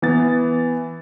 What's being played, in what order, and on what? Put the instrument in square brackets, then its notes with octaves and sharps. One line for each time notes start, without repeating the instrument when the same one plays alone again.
[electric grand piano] E3 B3 A6